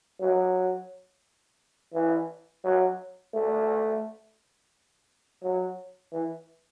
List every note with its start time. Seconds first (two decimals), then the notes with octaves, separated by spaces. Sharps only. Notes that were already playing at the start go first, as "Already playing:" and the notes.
0.21 F#3
1.94 E3
2.65 F#3
3.34 A3
5.44 F#3
6.13 E3